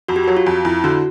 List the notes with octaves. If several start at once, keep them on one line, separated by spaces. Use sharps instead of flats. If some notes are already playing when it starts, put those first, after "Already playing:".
F2 F#4
G4
F#3 F#4
F4
F2
F2 E4
D3 F#4